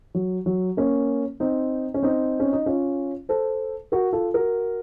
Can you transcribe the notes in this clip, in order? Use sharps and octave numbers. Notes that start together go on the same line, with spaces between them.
F#3
F#3
A#3 C#4
C4 D#4
C#4
C4 D#4
C#4
D#4
C#4 F4
A4 C5
F#4 A#4
F4 A4
F#4 A#4